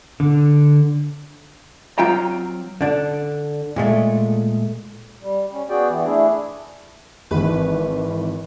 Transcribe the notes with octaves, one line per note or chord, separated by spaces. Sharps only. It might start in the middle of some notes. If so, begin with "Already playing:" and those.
D3
F#3 C4 F4 G5 A#5
D3 D4
A#2 G#3 A3
G3
C#4
B3 F#4 G#4 D5 G5
E3 B3
A3 D4 E4 G#4
G#1 E3 B4